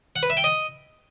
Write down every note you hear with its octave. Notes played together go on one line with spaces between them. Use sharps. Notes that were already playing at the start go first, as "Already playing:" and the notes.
F#5
B4
E5
G5
D#5